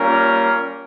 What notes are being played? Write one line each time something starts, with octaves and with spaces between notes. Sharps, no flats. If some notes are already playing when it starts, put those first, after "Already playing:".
Already playing: G3 A#3 C#4 F4 A#4